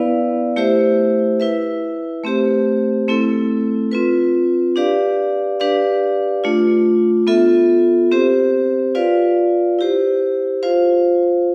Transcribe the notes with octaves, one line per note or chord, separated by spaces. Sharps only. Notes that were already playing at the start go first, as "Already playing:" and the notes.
Already playing: B3 E4 B4 D5 F5
A3 E4 G4 C5 E5
E4 B4 E5
A3 C4 G4 C5
A3 C4 E4 A4
C4 F4 B4
D4 G4 B4 D5 F5
D4 G4 B4 D5 F5
A3 D4 F4
B3 F4 A4 E5
C4 G4 C5
F4 B4 D5 F5
E4 G4 C5
F4 C5 F5